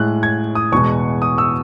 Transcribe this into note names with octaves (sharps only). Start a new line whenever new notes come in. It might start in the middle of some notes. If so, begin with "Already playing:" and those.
Already playing: A2 G#3 F#6
G#6
D#6
E2 B2 G#3 C#6
D#6
E6